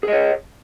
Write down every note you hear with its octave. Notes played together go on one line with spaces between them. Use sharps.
G#4 C#5 D#5